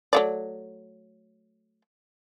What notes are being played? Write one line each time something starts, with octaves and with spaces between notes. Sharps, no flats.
F#3 A3 D5